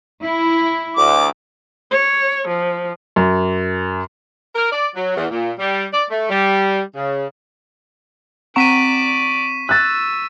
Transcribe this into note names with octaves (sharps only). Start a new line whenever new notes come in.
E4
D2 D6
C#5
F3
F#2
A#4
D5
F#3
E2
A#2
G3
D5
A3
G3
C#3
C4 D5 F#5 A#5 C#6 B6 D7 D#7
E6 F#6 A6